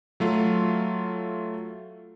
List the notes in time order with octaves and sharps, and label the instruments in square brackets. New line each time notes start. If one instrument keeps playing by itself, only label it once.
[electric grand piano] F#3 A3 F4